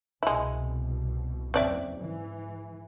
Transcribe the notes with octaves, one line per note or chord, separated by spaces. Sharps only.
C2 B2 G#3 E4
F#1 E2 C4 D5 E5
G#2 E3